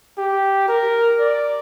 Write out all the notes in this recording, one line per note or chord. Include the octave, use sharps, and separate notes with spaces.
G4
A#4
D5